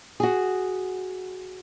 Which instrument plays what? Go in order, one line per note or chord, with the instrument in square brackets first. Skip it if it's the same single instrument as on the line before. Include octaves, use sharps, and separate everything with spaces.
[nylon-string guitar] F#4 G#4